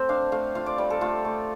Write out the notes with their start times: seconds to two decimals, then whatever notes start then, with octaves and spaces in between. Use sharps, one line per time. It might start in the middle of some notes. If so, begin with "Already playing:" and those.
Already playing: A3 C4 C5
0.09 D4 F5
0.32 A3 F5
0.55 F4 F5
0.66 D5
0.78 G3 D5
0.90 A4
1.01 A3 F4
1.25 A3